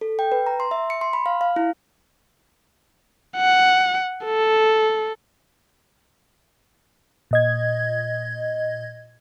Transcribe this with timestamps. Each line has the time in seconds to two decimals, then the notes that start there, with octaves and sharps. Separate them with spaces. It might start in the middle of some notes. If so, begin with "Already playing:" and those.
0.01 A4
0.19 G5
0.32 B4
0.46 A#5
0.60 C6
0.71 E5
0.90 C#7
1.01 C6
1.13 B5
1.26 F5
1.41 F5
1.56 E4
3.37 F#5
4.25 A4
7.31 A#2 D#5 G#6